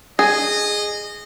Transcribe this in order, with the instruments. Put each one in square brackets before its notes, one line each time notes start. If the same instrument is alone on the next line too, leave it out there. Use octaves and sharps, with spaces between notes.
[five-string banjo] G#4 [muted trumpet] D#5